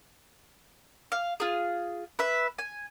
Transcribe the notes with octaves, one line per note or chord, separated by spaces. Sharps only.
F5
F4 G#4
B4 E5
G#5